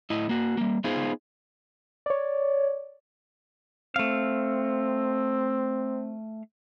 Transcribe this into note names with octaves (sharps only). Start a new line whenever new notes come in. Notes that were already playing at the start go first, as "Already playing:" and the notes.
A2 E4 D#5
A#3 F#4
G3 A#3
B3 D#4 F4 G#4 C5
C#5 D5
A3 C4 F5